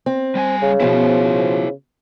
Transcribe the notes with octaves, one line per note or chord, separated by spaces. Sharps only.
C4
G3 G5 G#5
C#3
B2 F3 E4 C5